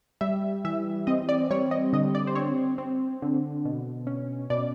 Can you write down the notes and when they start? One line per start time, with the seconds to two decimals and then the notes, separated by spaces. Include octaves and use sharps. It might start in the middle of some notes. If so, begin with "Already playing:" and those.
0.21 G3 E5
0.65 E3 E5
1.07 C4 D#5
1.29 D5
1.50 G3 C#5
1.71 D#5
1.93 D3 D#5
2.15 D5
2.27 C5
2.35 C4 C#5
2.78 C4
3.22 D3
3.65 B2
4.07 C#4
4.50 B2 D5